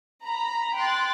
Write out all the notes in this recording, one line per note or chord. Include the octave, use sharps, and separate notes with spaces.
A#5 B5
G5 C6 F#6 A6